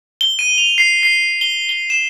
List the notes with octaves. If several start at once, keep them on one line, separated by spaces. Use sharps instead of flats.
G7
D#7
F7
C7
C7
G7
G7
E7